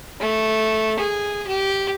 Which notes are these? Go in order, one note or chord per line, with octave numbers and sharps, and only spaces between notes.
A3
G#4
G4